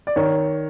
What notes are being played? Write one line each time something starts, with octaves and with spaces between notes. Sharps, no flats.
D5
D#3 C#5